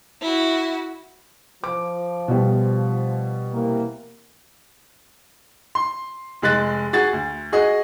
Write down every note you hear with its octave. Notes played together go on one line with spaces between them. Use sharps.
E4 F#4
F3 D6
B2 G3
C3 E3 A#3
C6
F1 G#3 F#6 A6
F#4 G#4 A6
D2
F#4 G#4 D#5